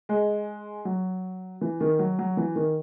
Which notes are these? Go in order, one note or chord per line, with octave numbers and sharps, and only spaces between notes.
G#3
F#3
E3
D#3
F#3
F#3
E3
D#3